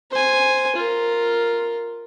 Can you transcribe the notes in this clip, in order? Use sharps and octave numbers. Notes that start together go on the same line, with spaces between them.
C5 G#5
F4 A#4